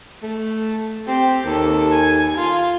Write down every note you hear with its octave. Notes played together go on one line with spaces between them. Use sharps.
A3
C4 G4
D#2 A4
G#5
F4